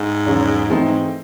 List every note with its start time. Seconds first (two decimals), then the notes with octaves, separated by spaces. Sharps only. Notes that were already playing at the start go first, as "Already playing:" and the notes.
Already playing: G#2
0.26 E2 C#3 F#3
0.69 A2 E3 A3 C4 D#4
0.85 G#2